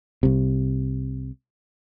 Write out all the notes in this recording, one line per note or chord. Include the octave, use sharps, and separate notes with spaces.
C2 C3